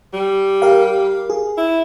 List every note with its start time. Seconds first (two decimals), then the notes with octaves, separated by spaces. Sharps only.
0.14 G3
0.62 G4 A#4 F5
1.30 G#4
1.58 E4